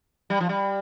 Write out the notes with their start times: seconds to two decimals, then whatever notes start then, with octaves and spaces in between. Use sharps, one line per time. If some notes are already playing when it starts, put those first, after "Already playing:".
0.30 G3
0.40 F3
0.49 G3